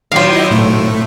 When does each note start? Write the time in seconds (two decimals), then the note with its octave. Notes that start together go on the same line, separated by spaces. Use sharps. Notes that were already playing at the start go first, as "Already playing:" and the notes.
0.12 D#3 F#3 F4 C5 F5
0.33 E4 D#5
0.51 A2 A3